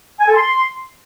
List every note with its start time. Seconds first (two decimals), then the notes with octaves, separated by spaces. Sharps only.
0.20 G#5
0.27 A4
0.35 C6